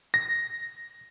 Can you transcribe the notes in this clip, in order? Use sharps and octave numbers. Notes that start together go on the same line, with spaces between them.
A#6